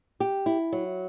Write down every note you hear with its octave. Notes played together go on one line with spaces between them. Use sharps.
G4
E4
F#3